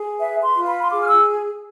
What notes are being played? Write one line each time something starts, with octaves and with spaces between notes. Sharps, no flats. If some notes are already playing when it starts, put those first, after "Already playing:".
Already playing: G#4
B4 E5
C6
F4
B5
C6
G#4 D6
F6
E6